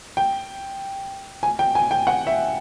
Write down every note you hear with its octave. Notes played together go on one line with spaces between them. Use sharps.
G5
G#5
G5
G#5
G5
F#5
E5